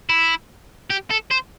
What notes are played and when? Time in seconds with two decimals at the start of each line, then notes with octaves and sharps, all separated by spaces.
0.09 E4
0.90 G4
1.10 A4
1.31 C5